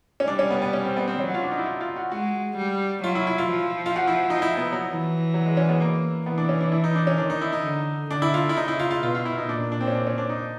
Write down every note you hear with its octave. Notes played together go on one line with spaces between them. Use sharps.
C#4
G3 D4
C#4
B3
B3
C#4
C4
B3
C4
F#3 C#4
F#4
F4
D4
D#4
E4
F4
F4
F#4
G#3 F#4
G3
F#3 F4
E4
E4
F4
F3
F4
F#4
E4
D#4
E4
B3
F#3
E3
F#3
G#3
C#4
B3
A#3
E3 B3
D4
C#4
D4
E4
D#4
D4
C#4
D#3 D4
D#4
E4
D#4
D3
D3 D4
E4
F4
E4
C#3 D#4
E4
F4
F4
B2 F4
F4
E4
D#4
A#2 D4
D4
C4
C#4
D4
C#4
D4
D#4